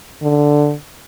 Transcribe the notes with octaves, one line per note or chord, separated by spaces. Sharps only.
D3